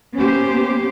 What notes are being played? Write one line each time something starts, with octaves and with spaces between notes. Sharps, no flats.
A#3 B3 C#4 G4 C5